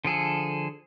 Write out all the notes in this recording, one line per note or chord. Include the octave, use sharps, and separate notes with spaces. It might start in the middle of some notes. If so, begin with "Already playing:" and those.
D3 F3 G#4 A4